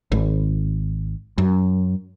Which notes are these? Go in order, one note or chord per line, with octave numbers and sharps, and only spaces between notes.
G#1
F#2